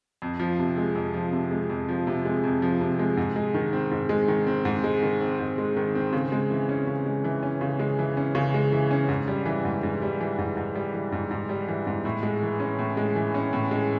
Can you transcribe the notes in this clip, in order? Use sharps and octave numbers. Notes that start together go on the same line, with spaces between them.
F2
F3
C3
G#3
F2
F3
C3
G#3
F2
F3
C3
G#3
F2
F3
C3
G#3
G#2
G#3
D#3
C4
G#2
G#3
D#3
C4
G#2
G#3
D#3
C4
G#2
G#3
D#3
C4
C#3
G#3
E3
C#4
C#3
G#3
E3
C#4
C#3
G#3
E3
C#4
C#3
G#3
E3
C#4
G#2
G3
E3
G#2
G#2
G3
E3
G#2
G#2
G3
E3
G#2
G#2
G3
E3
G#2
A2
G#3
E3
C#4
A2
G#3
E3
C#4
A2
G#3